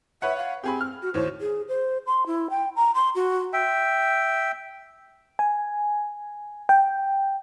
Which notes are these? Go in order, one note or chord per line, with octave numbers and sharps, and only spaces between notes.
B4 C#5 E5 F#5
F5
C4 G4 G#4 B5
F6
F#4
D#2 A2 C5 C#5
G#4
C5
C6
E4
G5
A#5
C6
F#4
E5 G5
G#5
G5